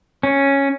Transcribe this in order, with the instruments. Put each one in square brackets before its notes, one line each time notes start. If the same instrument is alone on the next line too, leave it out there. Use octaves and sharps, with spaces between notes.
[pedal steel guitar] C#4